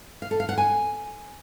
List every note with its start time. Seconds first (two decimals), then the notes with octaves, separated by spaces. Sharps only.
0.22 F5
0.31 A4
0.40 F5
0.49 F#5
0.58 G#5